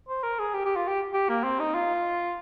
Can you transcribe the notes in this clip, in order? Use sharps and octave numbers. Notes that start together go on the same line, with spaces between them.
C5
A#4
G#4
G4
G4
F4
G4
G4
A#3
C4
D#4
F4